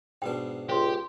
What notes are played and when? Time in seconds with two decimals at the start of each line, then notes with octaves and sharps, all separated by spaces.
0.22 G#2 B2 D4 B4 G5
0.69 C#2 G4 C5 C6